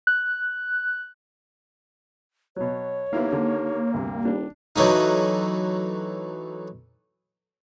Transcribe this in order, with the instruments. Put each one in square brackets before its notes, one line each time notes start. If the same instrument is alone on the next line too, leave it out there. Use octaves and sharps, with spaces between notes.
[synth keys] F#6
[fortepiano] B2 F#3 [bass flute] C#5
[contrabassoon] D#2 [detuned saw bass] A#3 [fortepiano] B3 E4 F5
[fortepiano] D3
[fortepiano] D2 G2 C3 [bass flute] G3
[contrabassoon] D#1 [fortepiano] D4
[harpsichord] E3 F#3 A3 D#4